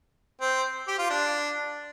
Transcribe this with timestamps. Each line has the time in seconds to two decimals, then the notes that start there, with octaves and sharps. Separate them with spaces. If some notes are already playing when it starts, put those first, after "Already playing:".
0.41 C4
0.88 G4
0.98 F4
1.10 D4